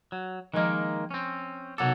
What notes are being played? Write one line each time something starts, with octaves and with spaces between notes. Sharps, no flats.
F#3
D#3 F3 G#3 A#3 D#5
C4 C#4
B1 C3 F#3 A4 F#5 D6